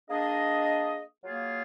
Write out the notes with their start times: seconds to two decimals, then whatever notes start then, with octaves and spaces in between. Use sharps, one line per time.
0.09 A#3 D4 G#4 D#5
1.24 F#3 A#3 F4 G#4